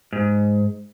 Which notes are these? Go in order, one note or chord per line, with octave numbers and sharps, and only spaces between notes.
G#2